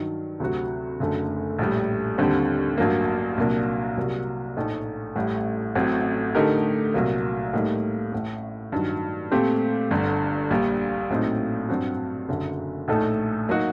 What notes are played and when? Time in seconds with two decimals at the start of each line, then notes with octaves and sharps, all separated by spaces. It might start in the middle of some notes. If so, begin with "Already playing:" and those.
Already playing: G2 D#3 F#3
0.40 D2 C3 F#3 C4 F#4
1.00 F#1 F#2 D3 A3
1.59 A#1 A2 G3
2.18 D#2 D3 G3 C4
2.78 A1 G2 F#3 A#3
3.37 C2 A#2 F#3 A#3 D4
3.97 C2 C3 F#3 A#3
4.57 A#1 A2 A3 D#4
5.15 A1 A2 G3
5.75 A1 A2 F#3 C4
6.35 D3 A3 D#4 G4 A#4
6.94 C2 A#2 F#3 A#3
7.53 A2 G3 A#3 D#4
8.12 A1 A2 A3
8.72 G2 D#3 F#3
9.31 A#2 A3 C4 G4 C5
9.91 G1 G2 D3
10.51 A#1 A#2 G3
11.10 A#1 A2 F#3 C4 D#4
11.69 G2 F#3 C4 F#4
12.29 F#1 F#2 D3 F#3
12.88 A#1 A2 A3 D#4 A4
13.49 F#3 A#3 D#4 F#4